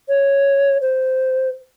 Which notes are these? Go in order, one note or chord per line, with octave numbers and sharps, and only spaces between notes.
C#5
C5